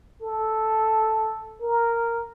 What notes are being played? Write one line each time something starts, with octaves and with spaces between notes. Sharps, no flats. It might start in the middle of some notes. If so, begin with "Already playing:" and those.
A4
A#4